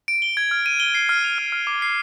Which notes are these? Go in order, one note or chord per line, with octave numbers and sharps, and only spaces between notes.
D7
G7
G#6
F6
D#7
G7
C7
F6
F7
F6
F6
D6
C7